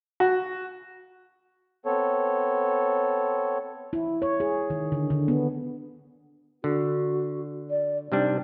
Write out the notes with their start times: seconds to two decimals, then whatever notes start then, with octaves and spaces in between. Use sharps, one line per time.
0.20 F#4
1.86 B3 C4 A4 C#5
3.93 E4
4.22 C#5
4.40 G#4
4.70 D#3
4.92 D3
5.10 D3
5.28 B3
6.64 D3 F#4
7.70 D5
8.12 C3 G3 D4 D#4